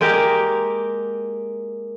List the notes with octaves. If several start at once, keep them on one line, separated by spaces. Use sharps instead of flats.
G#3 A#3 G4 A#4